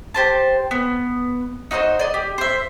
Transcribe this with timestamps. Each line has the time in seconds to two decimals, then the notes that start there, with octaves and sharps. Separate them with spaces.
0.14 G4 C5 A5
0.71 B3
1.71 D#4 F#4 C5 D#5
1.99 D5 D#5
2.14 G4
2.38 C5 E5